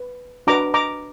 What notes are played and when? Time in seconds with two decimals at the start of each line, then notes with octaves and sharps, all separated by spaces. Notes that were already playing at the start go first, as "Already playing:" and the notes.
Already playing: B4
0.47 D4 F#4 B4 A#5 D6
0.74 A#5 D6